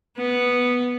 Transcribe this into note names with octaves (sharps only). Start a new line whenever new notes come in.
B3